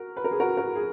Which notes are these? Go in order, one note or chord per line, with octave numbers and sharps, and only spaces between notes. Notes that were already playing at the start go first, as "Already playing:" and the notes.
Already playing: F#4 A#4
B4
A#4
G#4
F#4 A#4
F#4 A#4
G#4